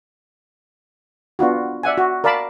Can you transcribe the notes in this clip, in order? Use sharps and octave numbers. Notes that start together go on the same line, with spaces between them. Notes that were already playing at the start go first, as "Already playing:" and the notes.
B3 D4 F4 F#4
D5 E5 F#5 G#5
F#4
A#4 D5 F5 A5 B5